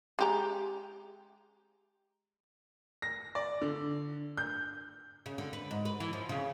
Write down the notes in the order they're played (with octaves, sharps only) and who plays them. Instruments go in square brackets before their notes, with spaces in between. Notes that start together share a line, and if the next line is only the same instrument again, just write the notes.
[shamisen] G#3 G4 A#5
[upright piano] A#6
D5
D3
G6
[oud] C#3
D3
B4
G#2
B4
E3
F3
C#3